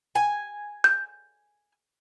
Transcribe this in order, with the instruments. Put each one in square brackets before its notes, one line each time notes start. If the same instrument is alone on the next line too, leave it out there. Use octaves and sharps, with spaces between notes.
[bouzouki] G#5
[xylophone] G6